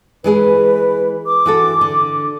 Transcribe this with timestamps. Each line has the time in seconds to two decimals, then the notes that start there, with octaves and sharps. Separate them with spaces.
0.24 E3 G#3 G#4 B4
1.26 D6
1.46 E3 F#4 A4
1.81 D3